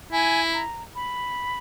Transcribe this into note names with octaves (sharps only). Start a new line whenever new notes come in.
E4 G#5
A#5
B5